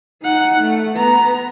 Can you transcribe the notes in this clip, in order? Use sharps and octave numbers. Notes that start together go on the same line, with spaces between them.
D#4 F#5
A3
B3 A#5